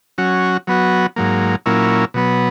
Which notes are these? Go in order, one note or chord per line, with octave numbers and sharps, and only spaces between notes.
F#3 C#4 F#4
F#3 B3 F#4
G#2 F#3 A#3
A#2 F#3 A#3 C#4 E4
B2 F#3 B3